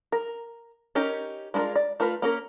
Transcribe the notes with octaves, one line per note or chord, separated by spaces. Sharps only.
A#4
C#4 D#4 G4 A#4
G#3 D4 E4 F4 A#4
D5
A3 F4 A#4 B4
A#3 C#4 A#4